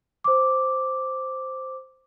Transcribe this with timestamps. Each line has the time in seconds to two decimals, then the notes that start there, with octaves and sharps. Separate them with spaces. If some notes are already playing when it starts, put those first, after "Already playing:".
0.24 C5 D6